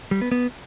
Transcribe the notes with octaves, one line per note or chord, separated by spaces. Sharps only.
G3
B3
B3